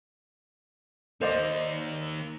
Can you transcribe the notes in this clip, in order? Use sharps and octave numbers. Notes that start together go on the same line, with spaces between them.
A#3 D#4 C5 D5 D#5